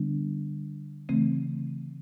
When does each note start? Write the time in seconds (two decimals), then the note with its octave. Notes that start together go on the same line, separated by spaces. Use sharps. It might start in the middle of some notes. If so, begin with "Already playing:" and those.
Already playing: D3 G3 B3 D4
1.09 C#3 E3 A3 C4